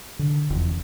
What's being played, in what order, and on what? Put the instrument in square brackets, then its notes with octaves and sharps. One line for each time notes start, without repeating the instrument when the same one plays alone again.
[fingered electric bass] D3
F1 E2